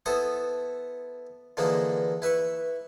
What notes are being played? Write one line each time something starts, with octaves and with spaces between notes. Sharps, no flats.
B3 E4 A4 C5 D#6
D3 E3 F3 G#3 A#3 D4
E4 B4 E5 C#6